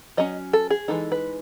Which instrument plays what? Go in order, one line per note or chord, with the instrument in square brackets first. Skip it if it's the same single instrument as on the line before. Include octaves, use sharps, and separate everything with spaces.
[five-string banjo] F#3 C#4 D#5
A4
G#4
E3 G#3 D#4 A4
B4